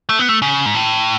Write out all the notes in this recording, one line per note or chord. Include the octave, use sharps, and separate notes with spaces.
A3
B3
A3
C#3
G#2
A2